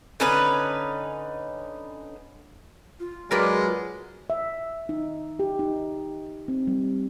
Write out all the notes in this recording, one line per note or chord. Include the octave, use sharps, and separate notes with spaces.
D3 C#4 D#4 B4
F4
F#3 G#3 A#4 B4 D5
E5
D#4
G4
D#4
C4
G3